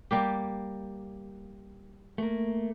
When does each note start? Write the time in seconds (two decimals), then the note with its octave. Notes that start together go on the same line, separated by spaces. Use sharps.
0.11 G3 A#3 G4
2.18 A3 A#3